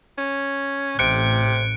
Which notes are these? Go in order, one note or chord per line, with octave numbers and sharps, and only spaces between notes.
C#4
A1 C3 F#6 C#7 D7